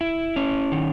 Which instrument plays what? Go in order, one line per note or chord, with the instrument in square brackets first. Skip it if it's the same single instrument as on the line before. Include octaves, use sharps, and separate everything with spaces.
[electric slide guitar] E4
C#4
D#3